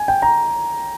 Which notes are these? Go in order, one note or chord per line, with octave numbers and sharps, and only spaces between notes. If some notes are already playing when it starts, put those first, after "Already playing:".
Already playing: G#5
G5
A#5